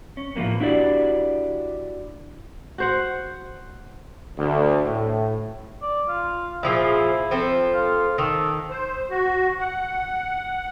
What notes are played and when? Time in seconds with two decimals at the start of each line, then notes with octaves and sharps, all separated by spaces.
0.17 C#4
0.35 A2 E3 F3 A#3 B3
0.60 D4 E4 F#4 G4 D5
2.78 F#4 C5 F#5
4.38 D2
4.85 A2
5.82 D5
6.08 F4
6.63 A#2 F3 E4 G#4
7.31 F3 C4 A4
7.74 F4
8.18 D#3 A4
8.69 C5
9.10 F#4
9.59 F#5